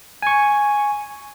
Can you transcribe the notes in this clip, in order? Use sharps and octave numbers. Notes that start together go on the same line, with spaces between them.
G#5 C#6